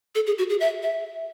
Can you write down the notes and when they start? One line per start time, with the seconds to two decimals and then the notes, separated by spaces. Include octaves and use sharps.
0.15 A4
0.27 G#4
0.38 F#4
0.50 G#4
0.60 E5
0.83 E5